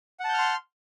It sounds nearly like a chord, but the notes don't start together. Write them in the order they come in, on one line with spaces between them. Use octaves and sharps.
F#5 A5 G6 F6 C6